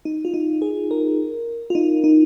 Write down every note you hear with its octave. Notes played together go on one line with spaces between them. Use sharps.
D#4
F4
D#4
G#4
A#4
F4
D#4
D#4